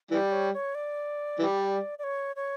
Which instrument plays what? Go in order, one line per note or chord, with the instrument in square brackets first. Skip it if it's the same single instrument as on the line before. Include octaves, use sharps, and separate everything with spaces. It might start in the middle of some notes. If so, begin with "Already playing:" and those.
[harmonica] E3 G3 [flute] D5
[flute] C#5
C#5
D5
[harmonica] E3 G3
[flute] D5
C#5
C#5